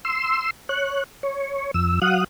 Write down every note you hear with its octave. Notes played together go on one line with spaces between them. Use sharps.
C6 E6
C#5 F#6
C#5
F2 E6
F#3 F5 F#5 D#6 F#6